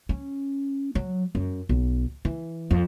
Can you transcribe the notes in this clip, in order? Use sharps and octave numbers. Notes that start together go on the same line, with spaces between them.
C#4
F#3
F#2
B1
E3
F2